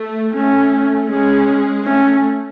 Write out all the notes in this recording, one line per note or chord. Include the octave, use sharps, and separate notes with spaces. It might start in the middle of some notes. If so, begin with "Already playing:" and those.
Already playing: A3
A3 C#4
G#3 C#4
A3 C#4